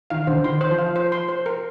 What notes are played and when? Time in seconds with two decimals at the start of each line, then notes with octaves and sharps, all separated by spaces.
0.10 D#3 F5
0.27 D3 C5
0.44 D#3 C6
0.61 C5
0.70 F3
0.78 F5
0.96 C5
1.12 C6
1.29 C5
1.46 A#4